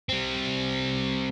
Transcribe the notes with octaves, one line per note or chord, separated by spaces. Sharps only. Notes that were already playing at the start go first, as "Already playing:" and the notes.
G3 C4